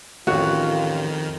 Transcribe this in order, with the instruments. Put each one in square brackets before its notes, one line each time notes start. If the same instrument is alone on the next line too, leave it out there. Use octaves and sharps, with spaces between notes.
[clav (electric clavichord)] A1 [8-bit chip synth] F2 D#3 [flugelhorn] F4 [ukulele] F#4